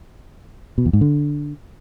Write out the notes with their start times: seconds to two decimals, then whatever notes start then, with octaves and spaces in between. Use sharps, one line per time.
0.78 B2
0.86 E2
0.93 G#2
1.01 D3